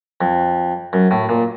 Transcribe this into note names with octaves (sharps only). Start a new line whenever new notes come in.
F2
F#2
A2
A#2